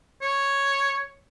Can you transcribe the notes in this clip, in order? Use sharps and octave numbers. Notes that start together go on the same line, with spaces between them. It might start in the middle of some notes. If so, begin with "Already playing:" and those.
C#5